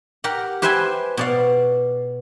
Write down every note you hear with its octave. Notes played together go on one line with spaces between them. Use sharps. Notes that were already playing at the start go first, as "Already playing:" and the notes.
G4 A#4 F#5
G4 B4 C5 E5 G5 G#5
B2 D5 F5